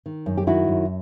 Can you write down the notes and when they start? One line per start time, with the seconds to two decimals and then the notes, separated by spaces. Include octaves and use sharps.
0.06 D#3
0.26 F#2
0.37 G4
0.47 D#3 E4 F#4
0.68 F#2